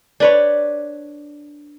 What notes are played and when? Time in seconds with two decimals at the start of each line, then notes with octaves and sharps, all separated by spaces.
0.20 D4 B4 C#5